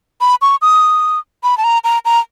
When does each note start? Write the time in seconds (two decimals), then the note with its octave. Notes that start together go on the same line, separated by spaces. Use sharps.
0.21 B5
0.42 C#6
0.62 D#6
1.43 B5
1.58 A5
1.64 A#5
1.84 A#5
2.05 A#5